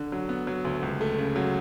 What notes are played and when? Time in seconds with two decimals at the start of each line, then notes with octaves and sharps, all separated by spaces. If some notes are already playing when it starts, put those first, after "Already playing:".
Already playing: D3
0.12 F#3
0.29 B3
0.47 F#3
0.65 D2
0.83 C#2
1.01 A3
1.18 C#3
1.36 F#3